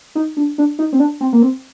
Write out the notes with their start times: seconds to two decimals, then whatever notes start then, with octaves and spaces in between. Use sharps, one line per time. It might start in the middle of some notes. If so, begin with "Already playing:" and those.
0.15 D#4
0.37 D4
0.58 D4
0.79 D#4
0.93 C4
1.00 D4
1.21 C4
1.33 A#3
1.42 C4